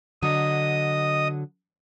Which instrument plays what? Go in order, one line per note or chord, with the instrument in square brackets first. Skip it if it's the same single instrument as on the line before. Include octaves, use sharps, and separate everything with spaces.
[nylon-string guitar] D3 F#3 [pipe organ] D#5 D#6